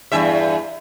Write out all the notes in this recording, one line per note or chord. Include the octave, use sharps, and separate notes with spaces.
E2 G2 E5